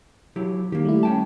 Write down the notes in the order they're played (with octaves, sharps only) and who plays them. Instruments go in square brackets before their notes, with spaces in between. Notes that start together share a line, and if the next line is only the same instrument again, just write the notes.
[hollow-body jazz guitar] F#3 E4 G4
[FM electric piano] D#3 [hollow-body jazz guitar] A#3 G4
[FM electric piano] G3 A3 E4
[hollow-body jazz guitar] C#4 G5 A5